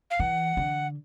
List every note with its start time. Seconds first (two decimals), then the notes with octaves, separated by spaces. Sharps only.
0.11 F5
0.20 E3 F#5
0.57 D3